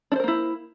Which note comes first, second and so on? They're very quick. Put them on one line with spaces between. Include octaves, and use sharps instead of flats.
D4 C5 A#4 A#3 E4